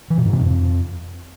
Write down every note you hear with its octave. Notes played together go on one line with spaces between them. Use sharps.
E3
B2
G#2
C3
F2